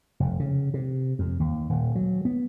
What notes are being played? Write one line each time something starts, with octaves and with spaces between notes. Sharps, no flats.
F1
C#3
C3
F2
D#2
D#1
F#3
B3